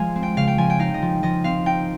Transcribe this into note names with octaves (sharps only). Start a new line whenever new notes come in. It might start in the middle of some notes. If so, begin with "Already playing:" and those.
Already playing: F3 G#3 F5 G#5
C4
G5
C#3 F5
G5
F3 G#5
G5
D#4 F5
D#5
F3
F3 D#5
C4 F5
D#4 G5